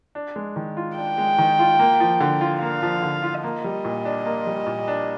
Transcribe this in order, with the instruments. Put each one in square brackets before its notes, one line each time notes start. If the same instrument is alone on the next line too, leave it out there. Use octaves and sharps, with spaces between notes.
[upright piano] D4
G#3
D#3
F4
[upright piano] D4 [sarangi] G5
[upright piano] G#3
D#3
F4
A#3
F3
D3
F4
[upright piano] A#3 [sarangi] F5
[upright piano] F3
D3
F4
[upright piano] A#3 [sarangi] D#5
[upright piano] G3
A#2
D4
A#3
G3
A#2
D4